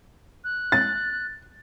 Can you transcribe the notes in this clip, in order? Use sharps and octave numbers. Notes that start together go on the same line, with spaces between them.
F#6
A6